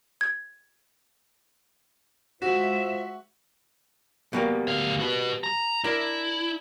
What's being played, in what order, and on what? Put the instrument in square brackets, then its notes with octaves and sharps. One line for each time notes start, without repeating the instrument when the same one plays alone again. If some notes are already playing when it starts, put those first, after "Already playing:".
[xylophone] G#6
[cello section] G#3 E5 [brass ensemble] F4 C5 [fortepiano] F#4 [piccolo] E7
[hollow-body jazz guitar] B2 G3 A#3
[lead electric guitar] D2 F5
F#4 B4
A#5
[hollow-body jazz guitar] D4 A#4 [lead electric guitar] E4